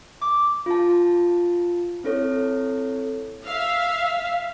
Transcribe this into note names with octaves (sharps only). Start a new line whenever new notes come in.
D6
F4 A5
C4 E4 A4 C#5
E5 F5